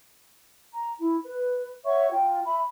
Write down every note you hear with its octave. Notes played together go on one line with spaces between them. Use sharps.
A#5
E4
B4
C#5 E5 F#5 C#6
F4 G5
E5 B5